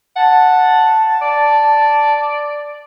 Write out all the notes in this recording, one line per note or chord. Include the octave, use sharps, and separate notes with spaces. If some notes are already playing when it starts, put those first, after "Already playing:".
F#5 A5
D5